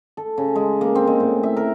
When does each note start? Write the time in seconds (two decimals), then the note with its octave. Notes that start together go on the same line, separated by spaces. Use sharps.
0.17 A4
0.38 C#3
0.55 G#3
0.81 A#3
0.95 C4
1.07 G#3
1.20 A2
1.43 E5
1.57 A#4